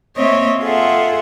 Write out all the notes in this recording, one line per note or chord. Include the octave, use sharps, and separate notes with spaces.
A#3 C4 C#5 D#5 E5
F4 G#4 A4 E5 F#5